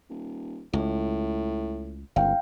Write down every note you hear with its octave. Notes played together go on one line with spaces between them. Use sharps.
D#1
C#2 A2
G1 C#2 F5 G5